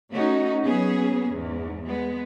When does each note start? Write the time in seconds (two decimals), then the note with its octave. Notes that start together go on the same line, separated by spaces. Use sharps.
0.11 A3 C#4 D#4 F#4
0.63 F#3 B3 C#4 G#4
1.31 E2 G#2
1.87 G#3 B3